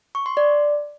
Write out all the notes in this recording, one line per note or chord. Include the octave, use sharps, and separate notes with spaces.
C#6
C6
D5